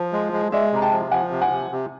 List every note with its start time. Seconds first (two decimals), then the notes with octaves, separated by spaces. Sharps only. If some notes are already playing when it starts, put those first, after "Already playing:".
Already playing: F3
0.13 G#3
0.33 G#3
0.52 G#3 D5 E5
0.72 C3 A#5
0.82 G5 A5
0.92 F3
1.11 F3 F#5 G#5
1.31 C3
1.42 F#5 G#5
1.52 C3
1.71 C3